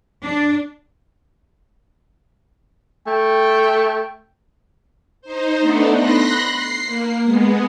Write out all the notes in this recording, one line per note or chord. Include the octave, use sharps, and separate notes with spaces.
D4
A3 G5
D#4 C5
A3 B3 D4 D#4
B5 C6 F#6 A#6
C7
A#3
G#3 B3